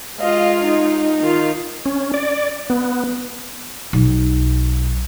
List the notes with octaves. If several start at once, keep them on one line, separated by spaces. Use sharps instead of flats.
G#3 F4 D#5 F5
D#4
D#3 F4
C#4
D5
B3
B1